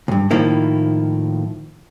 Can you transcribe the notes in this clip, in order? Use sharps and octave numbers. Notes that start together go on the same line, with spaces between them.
D2 G2
A2 D#3 F3 A#3 E4